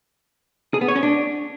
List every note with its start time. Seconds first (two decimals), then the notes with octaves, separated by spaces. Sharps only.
0.74 G#4
0.81 B3
0.88 C#5
0.96 C#4
1.03 D4